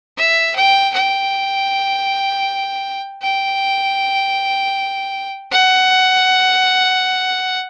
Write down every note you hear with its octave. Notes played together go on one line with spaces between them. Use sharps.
E5
G5
G5
G5
F#5